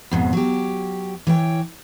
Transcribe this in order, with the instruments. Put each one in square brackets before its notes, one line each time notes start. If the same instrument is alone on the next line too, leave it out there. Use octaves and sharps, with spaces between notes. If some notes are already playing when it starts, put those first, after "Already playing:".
[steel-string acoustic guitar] F2 G#2 B2
F#3 G4
E3 C#5 G5